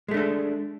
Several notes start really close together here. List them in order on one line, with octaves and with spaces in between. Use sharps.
G#3 A3 D4 A4